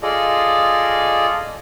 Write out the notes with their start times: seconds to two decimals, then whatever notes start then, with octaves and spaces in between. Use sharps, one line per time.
0.02 F4 G#4 A4 D5 D#5